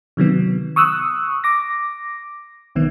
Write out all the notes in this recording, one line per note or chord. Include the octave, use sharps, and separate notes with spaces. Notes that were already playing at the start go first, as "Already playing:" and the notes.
C3 D#3 F#3 B3
C#6 D#6 E6 F#6
D6 A#6
B1 D#3 B3